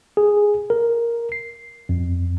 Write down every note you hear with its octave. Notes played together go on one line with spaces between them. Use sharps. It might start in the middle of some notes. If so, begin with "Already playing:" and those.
G#4
A#4
C7
F2